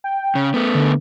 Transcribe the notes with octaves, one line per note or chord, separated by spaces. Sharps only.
G5
C#3
A3 B3
D3